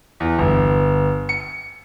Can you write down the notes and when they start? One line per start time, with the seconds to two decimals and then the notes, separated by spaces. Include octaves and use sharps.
0.20 E2
0.39 G1
1.29 C#7